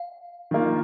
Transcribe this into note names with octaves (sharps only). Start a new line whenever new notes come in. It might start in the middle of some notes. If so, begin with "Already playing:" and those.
Already playing: F5
D#3 A#3 F4